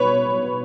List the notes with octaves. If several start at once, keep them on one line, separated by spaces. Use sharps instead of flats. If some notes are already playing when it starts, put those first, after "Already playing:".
Already playing: B2 F#3 B4 C#5